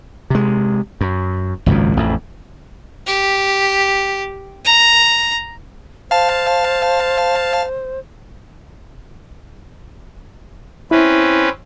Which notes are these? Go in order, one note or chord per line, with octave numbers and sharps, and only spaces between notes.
C3 G#3
F#2
G#1 C#2 F#2 A#2
A1 F2
G4
A#5
C5 F5 A5
C4 C#4 E4 B4